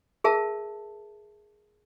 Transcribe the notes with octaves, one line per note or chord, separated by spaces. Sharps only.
G#4 A#4 E5 A5